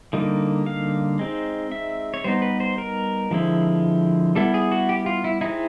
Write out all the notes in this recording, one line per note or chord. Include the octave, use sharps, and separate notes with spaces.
D3 G3 A#3 D#4
F5
G#3 C4 D#4
E5
C#5
G3 B3 D#4 C5
B4
C5
A#4
D3 F3 G#3 C4 E4
G3 B3 E4 A4
G#4
F#4
G4
F4
E4
G#3 C4 D#4 E4